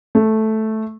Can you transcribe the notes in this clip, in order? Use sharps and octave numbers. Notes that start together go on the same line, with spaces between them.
A3